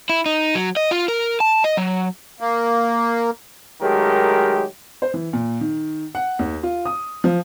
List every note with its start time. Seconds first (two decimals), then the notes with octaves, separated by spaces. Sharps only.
0.10 E4
0.26 D#4
0.55 F#3
0.76 D#5
0.91 F4
1.08 A#4
1.40 A5
1.64 D#5
1.77 F#3
2.40 A#3
3.81 D#3 F#3 G#3 A3 G4 A#4
5.02 C5
5.14 E3
5.33 A#2
5.61 D#3
6.15 F#5
6.39 D#2
6.63 F4
6.86 D#6
7.24 F3